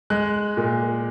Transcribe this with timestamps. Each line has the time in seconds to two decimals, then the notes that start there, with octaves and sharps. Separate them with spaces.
0.10 G#3 F#6
0.57 A#2